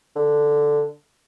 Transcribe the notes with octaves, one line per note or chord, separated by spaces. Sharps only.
D3